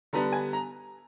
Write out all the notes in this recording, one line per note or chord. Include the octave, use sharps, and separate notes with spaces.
D3 G3 B3 D4 A#5
G#5
A#5